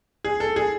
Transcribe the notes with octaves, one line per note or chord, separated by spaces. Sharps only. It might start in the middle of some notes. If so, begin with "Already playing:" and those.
G#4
A4
G#4